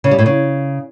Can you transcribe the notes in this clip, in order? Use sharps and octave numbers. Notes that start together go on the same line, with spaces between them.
C#3
G3
A2
C#3